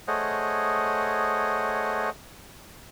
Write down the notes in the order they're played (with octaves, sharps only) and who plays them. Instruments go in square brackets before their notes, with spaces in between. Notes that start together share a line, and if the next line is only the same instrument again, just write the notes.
[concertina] A3 G#4 C5 C#5 D#5 F#5